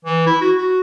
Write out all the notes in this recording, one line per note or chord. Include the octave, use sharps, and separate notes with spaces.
E3
E4
F#4
F#4